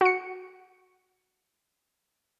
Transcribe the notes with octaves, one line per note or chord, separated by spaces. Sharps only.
F#4 C#7